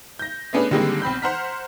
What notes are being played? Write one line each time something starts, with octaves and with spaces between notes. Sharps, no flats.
G6 A#6
A3 B3 C#4 D4 G#4 B4
D3 D#3 G3 G#3 A#3 C4
B1 C4 B5 G6
C5 F#5 A#5 F6 B6